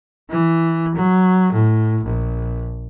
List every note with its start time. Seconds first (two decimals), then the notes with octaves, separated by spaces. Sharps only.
0.29 E3
0.95 F#3
1.53 A2
2.04 A#1